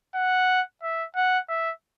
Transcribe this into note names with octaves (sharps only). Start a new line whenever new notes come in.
F#5
E5
F#5
E5